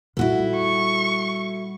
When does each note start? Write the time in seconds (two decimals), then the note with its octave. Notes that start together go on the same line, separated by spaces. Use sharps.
0.17 A#2 G3 E4 F#4 A4
0.56 C#6